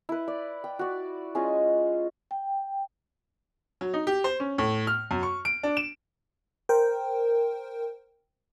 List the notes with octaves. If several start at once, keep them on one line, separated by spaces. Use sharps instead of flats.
E4 B4
D5
G5
F#4 D5
G#3 C#4 F4 D#5
G5
F#3
D#4
G4
C5
C#4
A2
F6
F#2
C#6
D7
D4
E7
A#4 C5 G5